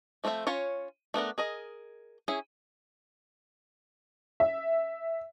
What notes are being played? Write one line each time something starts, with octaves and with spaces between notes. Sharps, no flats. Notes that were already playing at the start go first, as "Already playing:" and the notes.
F3 A3 C4 F4 E5
C#4 F4 C#5
A3 B3 D4 A#4
G#4 A#4 D#5
C#4 E4 G#4
E5